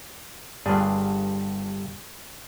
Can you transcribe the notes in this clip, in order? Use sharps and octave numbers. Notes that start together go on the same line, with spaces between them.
G1 G2 D4 G#4